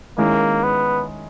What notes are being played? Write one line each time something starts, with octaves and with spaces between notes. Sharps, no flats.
D#3 G#3 A#3 C#4 E4
B3